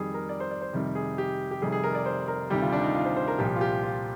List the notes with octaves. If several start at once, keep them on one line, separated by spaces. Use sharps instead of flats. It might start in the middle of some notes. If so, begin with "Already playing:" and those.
Already playing: F2 D#3 G3 G#4
A#4
D5
C5
D5
C5
F2 C3 D#3 G3
G#4
G4
G4
F1 F2 C3 D#3 G3 G#4
G#4
A#4
D5
C5
A#4
D2 C3 D#3 G3 G4
F4
D4
D#4
F4
C5
C5
A#4
C2 A#2 F3 G4
F4
G4
F4